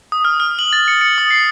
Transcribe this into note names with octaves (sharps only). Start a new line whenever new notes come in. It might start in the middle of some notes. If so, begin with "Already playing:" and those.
D#6
F6
F6
F#7
A6
C#7
C#7
D#6
C7